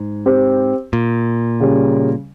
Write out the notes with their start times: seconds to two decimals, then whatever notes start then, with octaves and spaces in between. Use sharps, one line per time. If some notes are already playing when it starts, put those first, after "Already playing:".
Already playing: G#2
0.26 C4 G4 C5
0.93 A#2
1.60 C#3 G3 C#4